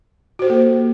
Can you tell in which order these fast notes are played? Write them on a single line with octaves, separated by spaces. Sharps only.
F#4 C5 G4 A4 A#3